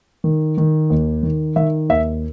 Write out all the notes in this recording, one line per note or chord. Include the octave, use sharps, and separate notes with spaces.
D#3
D#3
D#2
D#3
D#3 E5
D#2 E5